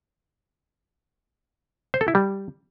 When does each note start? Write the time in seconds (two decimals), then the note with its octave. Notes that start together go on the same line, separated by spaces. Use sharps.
1.94 C5
2.01 A4
2.08 E4
2.15 G3